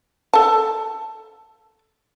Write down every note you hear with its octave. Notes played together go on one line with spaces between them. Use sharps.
A4 A5